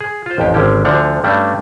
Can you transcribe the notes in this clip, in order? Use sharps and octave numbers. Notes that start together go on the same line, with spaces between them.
G#4
F4 C5
A1 F2 G4
G#1 D3 C#4 G4
D2 D3 F3 D4 F#5 A#5
G2 G3 A3 C#4 D4